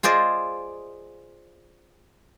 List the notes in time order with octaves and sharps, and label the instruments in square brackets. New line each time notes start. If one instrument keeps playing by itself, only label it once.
[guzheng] F4 G#4 C5 D5 D#5